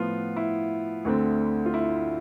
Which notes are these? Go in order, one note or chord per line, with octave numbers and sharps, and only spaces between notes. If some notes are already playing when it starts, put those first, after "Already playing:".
Already playing: A2 F3 B3 F4
E4
D2 D3 A3 C4
F4
E4